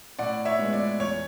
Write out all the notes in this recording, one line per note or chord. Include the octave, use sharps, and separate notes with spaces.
A2 D5 F#5
C#5 E5
G#3 B3
D5
E2 C#5